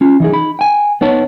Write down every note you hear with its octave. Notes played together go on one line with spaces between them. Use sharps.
C#4 F4
E3 D#4 G#4
D#4 B5
G5 G#5
B3 D#4 C#5 A5